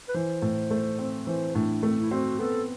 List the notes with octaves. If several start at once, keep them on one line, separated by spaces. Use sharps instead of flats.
B4
E3 C5
A2
A3
C4
E3 C5
A2 D4
A3 C4
E4
C4 F#4
B3 A4